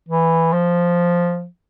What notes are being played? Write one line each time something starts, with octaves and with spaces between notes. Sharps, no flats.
E3
F3